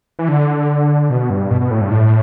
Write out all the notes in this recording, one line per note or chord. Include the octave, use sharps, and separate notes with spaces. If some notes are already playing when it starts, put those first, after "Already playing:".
E3
D3
B2
G2
B2
B2
A2
G2
A2